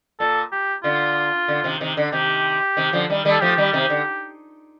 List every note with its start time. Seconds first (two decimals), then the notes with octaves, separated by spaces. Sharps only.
0.20 A#2 A4
0.52 G4
0.84 D3 F4
1.48 D3
1.64 C3 D#3
1.81 C3 D#3
1.97 D3
2.12 C3 D#3 G4
2.77 C3 D#3
2.93 D3 F3
3.10 D#3 G3
3.25 D#3 G3
3.31 A4
3.41 F3 A3 G4
3.58 D#3 G3
3.73 C3 D#3
3.90 D3